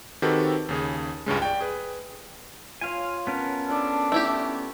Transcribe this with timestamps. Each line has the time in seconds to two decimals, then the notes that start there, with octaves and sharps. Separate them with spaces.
0.22 D#3 C4 F#4 G4 A4 B4
0.69 D#2 C#3 G#4
1.26 C#2 G2 C#3 G#3
1.42 D5 G5
1.60 G#4 B4
2.81 F4 C#5 F5 G#5
3.27 B3 C#4 A#4 A5
3.69 D4 A4
4.12 A3 E4 G4